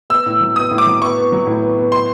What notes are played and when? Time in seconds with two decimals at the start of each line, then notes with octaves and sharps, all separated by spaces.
0.10 B3 E6
0.26 A2
0.41 F#3
0.56 B3 D#6
0.71 A2
0.78 D6
0.86 F#3
1.02 B3 C#6
1.17 B3
1.32 F#3
1.47 A2
1.62 B3
1.78 B3
1.92 C6